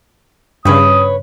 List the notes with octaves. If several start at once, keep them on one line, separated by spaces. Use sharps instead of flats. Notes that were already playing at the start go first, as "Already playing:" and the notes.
G2 C#3 B4 C#5 D#6